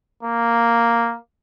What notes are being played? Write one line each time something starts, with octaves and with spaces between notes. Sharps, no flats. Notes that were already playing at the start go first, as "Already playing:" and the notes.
A#3